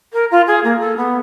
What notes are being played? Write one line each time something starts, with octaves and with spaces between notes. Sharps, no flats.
A#4
F4
G#4
A#3
A4
B3